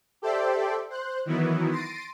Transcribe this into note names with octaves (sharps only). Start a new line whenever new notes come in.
G4 A4 C5 D5 E5 G5
C5 F#6
D#3 E3 F#3 B3 E4
C6 A6 A#6 C7 D7 D#7